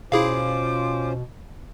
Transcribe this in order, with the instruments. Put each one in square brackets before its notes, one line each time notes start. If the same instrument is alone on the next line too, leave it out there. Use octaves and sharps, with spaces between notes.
[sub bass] B2 [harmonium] C#4 F4 C5 [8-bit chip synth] E4 G#4 F5 [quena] D6